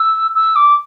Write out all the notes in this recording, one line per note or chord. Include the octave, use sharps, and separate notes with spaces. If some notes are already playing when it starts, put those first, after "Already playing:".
Already playing: E6
E6
D6